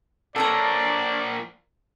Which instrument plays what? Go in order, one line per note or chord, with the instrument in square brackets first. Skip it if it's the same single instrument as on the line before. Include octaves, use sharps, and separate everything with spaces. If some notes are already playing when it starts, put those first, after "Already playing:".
[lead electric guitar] A#2 F3 [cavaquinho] A4 C#5 A#5 [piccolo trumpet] D5